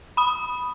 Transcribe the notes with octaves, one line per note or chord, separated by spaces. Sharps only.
B5 D#6